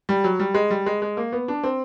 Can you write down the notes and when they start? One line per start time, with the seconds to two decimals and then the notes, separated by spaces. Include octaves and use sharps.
0.09 G3
0.24 F#3
0.40 G3
0.54 G#3
0.71 G3
0.86 G#3
1.02 G#3
1.17 A#3
1.33 B3
1.48 D4
1.64 C4